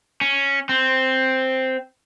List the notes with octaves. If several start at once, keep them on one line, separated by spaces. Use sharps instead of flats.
C#4
C4